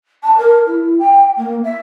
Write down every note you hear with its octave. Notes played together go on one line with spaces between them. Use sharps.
A5
A#4
E4
G5
A#3
E5